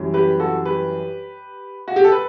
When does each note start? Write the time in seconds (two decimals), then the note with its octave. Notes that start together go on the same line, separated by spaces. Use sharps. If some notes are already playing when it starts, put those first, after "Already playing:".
Already playing: F#2 E3 G3
0.14 G4 B4
0.40 F#4 A4
0.65 G4 B4
1.88 F#4
1.96 G4
2.04 A4
2.12 B4